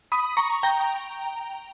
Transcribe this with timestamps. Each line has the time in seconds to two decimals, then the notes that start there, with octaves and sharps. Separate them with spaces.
0.12 B5 D#6
0.37 A#5 C#6
0.63 G5 A#5